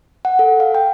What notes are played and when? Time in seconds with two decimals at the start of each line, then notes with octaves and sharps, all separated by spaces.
0.25 F#5
0.39 A4
0.60 F5
0.74 G5